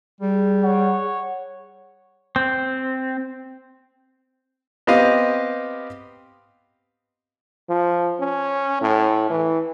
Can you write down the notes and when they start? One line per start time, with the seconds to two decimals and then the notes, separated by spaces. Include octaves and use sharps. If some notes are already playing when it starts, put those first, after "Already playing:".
0.20 G3 G#4
0.63 C#5 F#5
2.36 C4
4.87 B3 C4 G4 D#5 F5
7.69 F3
8.20 C#4
8.81 A2
9.30 E3